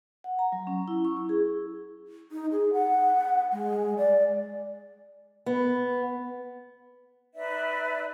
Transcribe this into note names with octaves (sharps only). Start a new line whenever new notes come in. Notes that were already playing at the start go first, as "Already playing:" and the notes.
F#5
A#5
F#3
C#4
E4
C#6
E4
G#4
D#4
G#4
F#5
G#3
D5
B3
D#4 B4 D5 E5